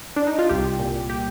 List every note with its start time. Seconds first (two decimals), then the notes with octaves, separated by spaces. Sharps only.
0.16 D4
0.27 D#4
0.39 F4
0.49 C2 G4
0.79 A#2
1.10 G4